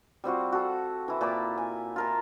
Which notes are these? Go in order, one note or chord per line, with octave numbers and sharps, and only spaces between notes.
G3 C4 F4 F#4
F#4 A4
E3 E4
A#2 A5 B5 D6
G#5
F4 A#4 A5